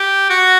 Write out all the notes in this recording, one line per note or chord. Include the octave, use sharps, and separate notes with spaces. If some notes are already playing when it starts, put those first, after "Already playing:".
Already playing: G4
F#4